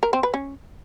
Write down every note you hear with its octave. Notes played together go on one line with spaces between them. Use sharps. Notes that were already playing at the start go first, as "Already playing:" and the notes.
A#4
C4
B4
C#4